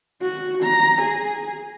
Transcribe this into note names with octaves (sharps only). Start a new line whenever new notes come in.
F#4
A#5
G#4